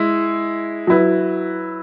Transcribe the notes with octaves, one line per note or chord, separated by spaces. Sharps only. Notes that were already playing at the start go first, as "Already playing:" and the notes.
Already playing: G#3 E4
F#3 E4 B4